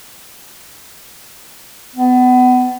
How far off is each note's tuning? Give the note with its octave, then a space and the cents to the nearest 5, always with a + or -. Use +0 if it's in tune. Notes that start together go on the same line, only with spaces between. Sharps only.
B3 +25